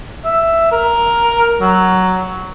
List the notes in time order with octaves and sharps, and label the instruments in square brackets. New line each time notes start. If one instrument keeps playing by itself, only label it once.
[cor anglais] E5
A#4
F#3